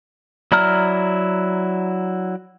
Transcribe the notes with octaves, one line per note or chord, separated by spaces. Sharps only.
F#3 E4 D5 A#5 F6